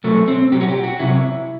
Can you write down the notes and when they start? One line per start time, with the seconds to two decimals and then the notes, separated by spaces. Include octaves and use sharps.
0.04 B2 F#3 A3
0.28 C4
0.52 B2 F#3 G4
0.61 F#4
0.68 G4
0.84 F#4
0.99 C3 F#3 E4